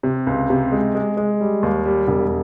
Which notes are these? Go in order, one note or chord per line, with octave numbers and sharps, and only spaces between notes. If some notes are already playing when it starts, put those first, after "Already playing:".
C3
C#2
C3
G#3
G#3
G#3
G3
D#2
G3
E1